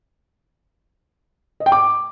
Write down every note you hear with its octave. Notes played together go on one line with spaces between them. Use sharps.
D#5
G5
D6